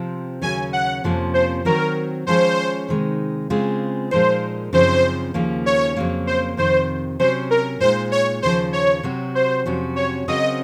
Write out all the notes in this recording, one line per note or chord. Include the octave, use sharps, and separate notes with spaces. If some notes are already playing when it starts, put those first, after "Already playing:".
Already playing: C3 F3 C4
D#2 C#3 F#3 C#4 G#5
F#5
F2 C3 F3 A#3 C#4
C5
D#3 F#3 C4 F#4 A#4
F3 G#3 C#4 G#4 C5 C#5
C3 D#3 G#3 D#4
C#3 G#3 C4 F4 G#4
A#2 F3 G#3 D#4 A#4 C5
F#2 C#3 F3 C4 D#4 C5
D#2 C#3 F3 A#3 C#4
C#5
F2 C#3 F#3 A#3
C5
F2 C3 D#3 C5
C3 F#3 C#4 C5
A#4
A#2 G#3 D#4 C5
C#5
D#2 C#3 F3 C5
C#5
C3 F#3 C4 F#4
C5
F2 C3 F#3 C#4 F#4
C#5
C#3 F#3 C4 F#4 A#4 D#5